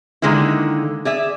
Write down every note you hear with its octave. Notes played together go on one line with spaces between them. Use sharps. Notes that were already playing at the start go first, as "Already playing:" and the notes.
D3 D#3 G#3 A#3 E4
G#4 D5 E5